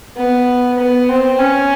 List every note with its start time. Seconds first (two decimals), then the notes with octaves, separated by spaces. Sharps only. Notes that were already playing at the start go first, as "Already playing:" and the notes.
0.16 B3
0.78 B3
1.09 C4
1.39 C#4